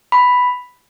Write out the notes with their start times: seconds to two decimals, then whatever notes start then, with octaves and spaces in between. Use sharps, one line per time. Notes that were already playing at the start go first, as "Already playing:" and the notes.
0.12 B5